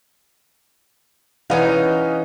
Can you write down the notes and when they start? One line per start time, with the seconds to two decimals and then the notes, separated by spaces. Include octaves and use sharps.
1.50 E3 C#4 D#4 B4 D#5 F5 F#5